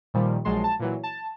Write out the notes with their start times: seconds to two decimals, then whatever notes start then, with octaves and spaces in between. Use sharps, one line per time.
0.14 A#2 D#3 F3 G3
0.45 A#1 F3 F#3 G#3 A5 C6
0.64 A5
0.79 A#2 E3 F#3
1.03 A5